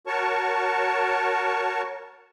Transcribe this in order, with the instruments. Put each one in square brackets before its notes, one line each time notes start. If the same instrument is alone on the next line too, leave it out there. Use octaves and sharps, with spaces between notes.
[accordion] F#4 A#4 C#5 A5 C#6